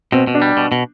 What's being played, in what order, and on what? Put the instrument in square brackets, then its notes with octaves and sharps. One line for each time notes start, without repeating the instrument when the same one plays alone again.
[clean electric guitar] B2 [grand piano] C4
[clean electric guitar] B2
[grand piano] D4
[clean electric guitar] G3
B2
B2